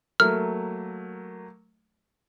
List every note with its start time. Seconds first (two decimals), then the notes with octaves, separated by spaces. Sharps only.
0.20 F#3 A3 A#3 F6